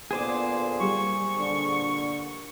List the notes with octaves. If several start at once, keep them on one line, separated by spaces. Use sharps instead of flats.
A#2 D3 B3 G#4 C5 D6
G3 C#6
A#2 D3